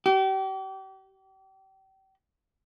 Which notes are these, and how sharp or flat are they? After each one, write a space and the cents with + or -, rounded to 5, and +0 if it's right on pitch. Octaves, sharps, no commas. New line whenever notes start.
G4 -35